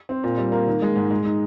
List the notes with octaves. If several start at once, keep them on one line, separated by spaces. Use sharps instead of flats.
C4
A#2
G3
A#3
D#3
G#3
G#2
G#3
D#4